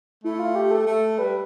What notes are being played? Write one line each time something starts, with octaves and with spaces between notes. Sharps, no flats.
A3 E4
F4
G4
A4
A3 A4
G3 B4